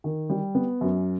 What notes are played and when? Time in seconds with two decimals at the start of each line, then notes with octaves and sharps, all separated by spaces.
0.04 D#3
0.30 G3
0.55 B3
0.81 F#2